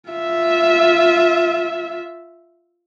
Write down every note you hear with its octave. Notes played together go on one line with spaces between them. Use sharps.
F4 E5